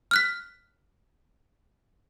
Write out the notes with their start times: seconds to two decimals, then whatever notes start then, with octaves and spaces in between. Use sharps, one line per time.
0.11 F6 F#6 B6